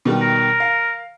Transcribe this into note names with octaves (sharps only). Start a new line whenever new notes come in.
B2 D#3 G3
A#4
F5